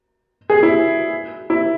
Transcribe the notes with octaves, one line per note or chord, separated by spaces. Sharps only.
G#4
E4
E4